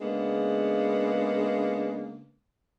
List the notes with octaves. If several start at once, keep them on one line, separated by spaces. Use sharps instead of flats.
C#3 G#3 A#3 B3 D4